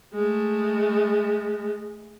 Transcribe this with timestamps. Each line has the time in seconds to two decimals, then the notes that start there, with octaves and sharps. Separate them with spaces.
0.14 G#3 A3